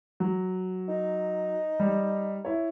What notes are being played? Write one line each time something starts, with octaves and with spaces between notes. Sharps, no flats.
F#3
D#4
G3
E4 C#5